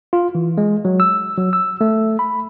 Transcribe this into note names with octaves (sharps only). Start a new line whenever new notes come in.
F4
E3
G#3
F#3
E6
F#3
E6
A3
B5